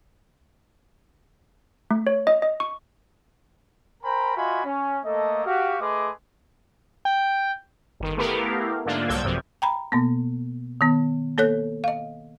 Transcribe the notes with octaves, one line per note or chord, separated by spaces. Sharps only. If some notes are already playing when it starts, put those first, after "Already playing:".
A3
C#5
D#5
D#5
C#6
A#4 C5 G5 G#5 A#5 B5
F4 F#4 D#5 E5 G#5 B5
C#4
A3 A#3 A4 D#5
F#4 G4 F5
A3 G#4 B4 D#5 C6 D6
G5
G1 D#3
A3 B3 E4 G4 A#4 F5
G#2 D3 A#3 D4 F4
C2 F#3 A4 G5 G#6
A1 F#2 C3 F3
G5 A#5 B5
B2 A#3 B3
D#3 B3
A#3 A4 C#5 F#6
D#5 F5